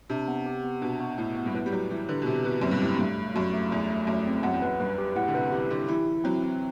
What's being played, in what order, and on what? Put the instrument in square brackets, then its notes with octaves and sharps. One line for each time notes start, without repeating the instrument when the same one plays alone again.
[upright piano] C3 [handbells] D4
[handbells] B3
G4
B3
[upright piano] B2 [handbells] D4
[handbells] B3
[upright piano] A2 [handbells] B3
[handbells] B3
[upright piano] G2
[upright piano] A2 [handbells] B4
[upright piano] G3
[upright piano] F#3 [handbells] G4
[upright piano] E3 [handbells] G4
[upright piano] D3 [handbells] B4
[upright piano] B2
[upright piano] C3 [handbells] G4
[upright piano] B2 [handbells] B4
[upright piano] F#2 [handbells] C4
[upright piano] G2
[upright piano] A2 [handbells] G4
[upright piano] G2 [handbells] A3
[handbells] A3
[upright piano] F#2 [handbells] F#4
[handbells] A3
[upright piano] E2 [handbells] A3
[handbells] A3
[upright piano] F#2 [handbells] A3
[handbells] C4
[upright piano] F#2 [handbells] F#5
[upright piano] E2
[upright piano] F#2 [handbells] B4
[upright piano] G2 [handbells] B4
[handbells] G4
[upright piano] A2 [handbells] F#5
[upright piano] D3
[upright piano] C3 [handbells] B4
[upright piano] E3 [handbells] G4
[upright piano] D3 [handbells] G4
[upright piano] E3 [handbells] E4
[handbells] E4
[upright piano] F#3 [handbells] C4
[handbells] C4